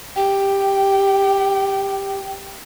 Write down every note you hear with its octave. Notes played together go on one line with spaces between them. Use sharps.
G4 G5